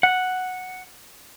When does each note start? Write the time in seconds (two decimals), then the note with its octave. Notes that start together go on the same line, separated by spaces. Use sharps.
0.03 F#5